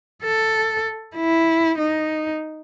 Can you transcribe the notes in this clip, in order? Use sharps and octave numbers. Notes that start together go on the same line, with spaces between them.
A4
E4
D#4